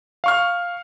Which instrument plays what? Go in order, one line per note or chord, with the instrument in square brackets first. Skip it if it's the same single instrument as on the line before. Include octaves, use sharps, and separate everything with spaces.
[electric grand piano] F5 C#6 F6